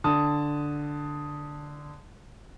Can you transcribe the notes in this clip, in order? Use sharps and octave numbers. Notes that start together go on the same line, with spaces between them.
D3 A5 D#6